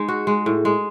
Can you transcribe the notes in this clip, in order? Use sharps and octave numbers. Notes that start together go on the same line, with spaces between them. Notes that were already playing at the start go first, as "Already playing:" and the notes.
Already playing: G#3 D#4
F#4
G#3
A2
G#3